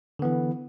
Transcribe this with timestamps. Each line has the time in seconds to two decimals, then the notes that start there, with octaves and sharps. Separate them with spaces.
0.19 D3
0.22 B3
0.25 E3